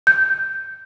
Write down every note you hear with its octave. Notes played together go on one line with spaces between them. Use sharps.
G6